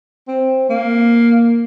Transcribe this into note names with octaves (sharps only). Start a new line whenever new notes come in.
C4
A#3